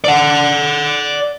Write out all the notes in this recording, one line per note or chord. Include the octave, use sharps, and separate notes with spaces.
D5 F#5